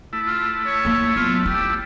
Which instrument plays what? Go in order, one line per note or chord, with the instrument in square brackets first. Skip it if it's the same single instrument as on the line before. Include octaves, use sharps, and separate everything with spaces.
[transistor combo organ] A3 E4
[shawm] F4
C#5
[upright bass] A#3 F4
[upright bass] F#3 B3 [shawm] F4
[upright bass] F4 [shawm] G4